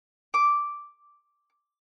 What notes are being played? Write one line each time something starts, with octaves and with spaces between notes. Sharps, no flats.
D6